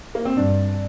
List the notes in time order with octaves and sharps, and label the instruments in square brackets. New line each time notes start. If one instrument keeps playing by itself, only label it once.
[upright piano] A#3
C4
[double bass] G2 [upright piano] D4